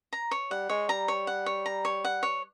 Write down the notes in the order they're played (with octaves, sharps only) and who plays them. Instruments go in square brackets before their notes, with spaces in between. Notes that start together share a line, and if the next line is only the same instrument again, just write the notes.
[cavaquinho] A#5
C#5
[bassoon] G3 [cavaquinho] F#5
[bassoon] G#3 [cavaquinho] C#5
[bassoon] G3 [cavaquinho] A#5
[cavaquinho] C#5
F#5
C#5
A#5
C#5
F#5
C#5